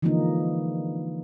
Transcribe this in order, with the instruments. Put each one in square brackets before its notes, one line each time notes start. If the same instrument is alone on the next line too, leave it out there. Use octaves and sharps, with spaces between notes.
[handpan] D3 E3 F3 G#3 A#3 D#4